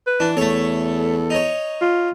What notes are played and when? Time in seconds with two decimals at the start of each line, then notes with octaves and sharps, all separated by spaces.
0.07 B4
0.20 E3 D4
0.37 E2 A3 A4 C#5
1.30 D#4 C#5
1.81 F4